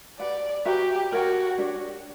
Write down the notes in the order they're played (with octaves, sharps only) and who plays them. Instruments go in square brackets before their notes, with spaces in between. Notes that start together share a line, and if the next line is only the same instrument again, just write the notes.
[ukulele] G4 B4 F#5 [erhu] D5
[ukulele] F#4 B4 E5 A#5 [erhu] G4
[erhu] F#4 [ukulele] A#4 C#5 G5 A#5
[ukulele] D4 G4 C#5